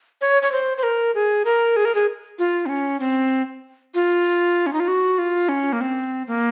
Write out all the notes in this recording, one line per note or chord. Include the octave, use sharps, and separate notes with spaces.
C#5
C#5
C5
C5
A#4
G#4
A#4
G#4
A#4
G#4
F4
C4
C#4
C4
F4
C#4
D#4
F4
F#4
F4
C#4
A#3
C4
A#3